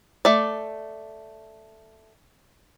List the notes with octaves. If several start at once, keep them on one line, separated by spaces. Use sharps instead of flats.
A3 D5